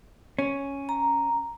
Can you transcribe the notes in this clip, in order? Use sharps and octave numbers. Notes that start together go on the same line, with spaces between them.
C#4
A#5